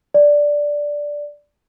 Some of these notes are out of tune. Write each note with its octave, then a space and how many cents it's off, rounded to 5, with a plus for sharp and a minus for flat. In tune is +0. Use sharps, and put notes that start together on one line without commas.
D5 -5